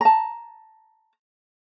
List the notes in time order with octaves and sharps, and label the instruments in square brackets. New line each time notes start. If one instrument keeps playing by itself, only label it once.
[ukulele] A5 A#5